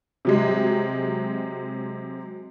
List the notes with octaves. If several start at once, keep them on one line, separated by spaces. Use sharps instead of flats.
C3 F#3 G#3